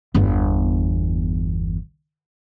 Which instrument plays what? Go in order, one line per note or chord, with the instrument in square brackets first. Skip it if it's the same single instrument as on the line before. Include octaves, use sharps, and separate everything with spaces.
[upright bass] G1 E2